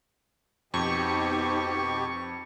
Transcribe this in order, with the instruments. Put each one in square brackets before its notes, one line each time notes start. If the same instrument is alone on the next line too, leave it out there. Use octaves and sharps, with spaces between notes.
[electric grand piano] F2 [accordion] B2 G4 [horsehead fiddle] D#4 C5 [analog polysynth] C#6